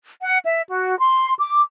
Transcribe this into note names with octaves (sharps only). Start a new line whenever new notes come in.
F#5
E5
F#4
C6
D6